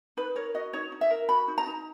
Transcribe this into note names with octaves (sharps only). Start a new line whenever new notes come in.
D#4 B4
A#4 C#5
F#4 D#5
D#4 C#5
D#4
E5
A#4
F#4 B5
D#4
A#5
D#4